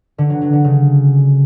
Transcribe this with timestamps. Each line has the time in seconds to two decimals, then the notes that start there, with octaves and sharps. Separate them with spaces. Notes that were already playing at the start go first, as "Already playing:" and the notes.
0.18 D3
0.30 F#3
0.41 F#3
0.53 D3
0.64 C#3